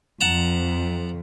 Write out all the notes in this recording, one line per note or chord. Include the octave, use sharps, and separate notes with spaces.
F2 F#5 A5 A#5